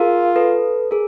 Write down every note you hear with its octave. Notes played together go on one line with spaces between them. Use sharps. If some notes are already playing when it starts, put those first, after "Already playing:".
Already playing: F4 G#4 A#4
A4 B4
G#4 A#4